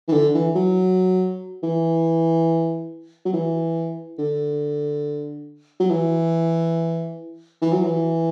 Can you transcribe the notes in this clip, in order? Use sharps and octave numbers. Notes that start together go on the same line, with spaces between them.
E3
D3
E3
F#3
E3
F#3
E3
D3
F#3
E3
E3
F#3
E3